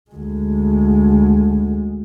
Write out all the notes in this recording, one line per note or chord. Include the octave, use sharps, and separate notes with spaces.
D2 G#3